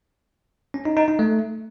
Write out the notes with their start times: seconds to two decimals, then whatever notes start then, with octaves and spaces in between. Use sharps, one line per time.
0.74 C#4
0.85 D#4
0.97 D#4
1.08 D#4
1.19 A3